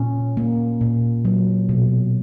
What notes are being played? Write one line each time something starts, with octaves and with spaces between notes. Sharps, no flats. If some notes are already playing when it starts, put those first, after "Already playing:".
Already playing: A#2 C#4
A#3
A#2
F#3
B2